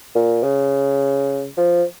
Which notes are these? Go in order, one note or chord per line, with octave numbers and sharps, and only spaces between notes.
A#2
C#3
F3